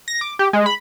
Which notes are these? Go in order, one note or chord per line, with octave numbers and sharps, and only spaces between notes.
A#6
D6
G4
G#3
B5